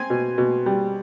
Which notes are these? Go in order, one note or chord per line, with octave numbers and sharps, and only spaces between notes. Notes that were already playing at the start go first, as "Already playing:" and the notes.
Already playing: C4 G#5
B2
B2
G3